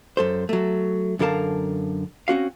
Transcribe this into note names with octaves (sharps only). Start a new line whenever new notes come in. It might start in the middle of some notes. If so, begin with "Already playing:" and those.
F#2 A4 C5
F#3 A3
F#2 D3 A4 A#4 F5 A5
C4 C#4 F#4 F5